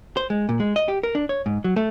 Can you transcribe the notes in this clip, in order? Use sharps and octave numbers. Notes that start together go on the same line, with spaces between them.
C5
G#3
A#2
G#3
D#5
G4
A#4
D4
C#5
G#2
F#3
A3